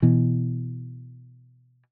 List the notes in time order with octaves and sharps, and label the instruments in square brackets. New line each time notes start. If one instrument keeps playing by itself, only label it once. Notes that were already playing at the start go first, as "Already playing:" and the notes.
[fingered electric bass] B2 E3